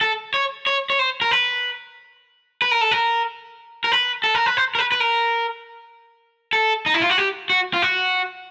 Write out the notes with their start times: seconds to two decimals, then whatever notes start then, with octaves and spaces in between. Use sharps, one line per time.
0.01 A4
0.34 C#5
0.67 C#5
0.90 C#5
0.99 C5
1.21 A#4
1.31 B4
2.62 B4
2.71 A#4
2.81 A4
2.91 A#4
3.84 A#4
3.92 B4
4.24 A4
4.35 A#4
4.46 B4
4.57 C5
4.75 A#4
4.79 B4
4.92 B4
5.00 A#4
6.53 A4
6.86 D#4
6.94 E4
7.02 F4
7.10 F#4
7.18 G4
7.50 F#4
7.74 F4
7.82 F#4